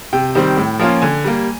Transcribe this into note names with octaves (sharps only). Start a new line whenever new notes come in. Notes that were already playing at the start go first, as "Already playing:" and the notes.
C3 G5
D#3 G3 C4
A2
F3 A#3 C#4 F4
D3 G#5
G3 A#3